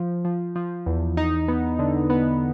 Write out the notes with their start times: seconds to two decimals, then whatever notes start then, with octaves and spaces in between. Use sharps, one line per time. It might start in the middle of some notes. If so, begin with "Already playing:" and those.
Already playing: F3
0.25 F3
0.56 F3
0.86 E2
1.17 D#4
1.48 B3
1.79 D3
2.10 B3